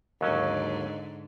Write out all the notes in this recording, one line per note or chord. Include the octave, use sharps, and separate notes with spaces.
D#2 G#2 D3 F#3 C#4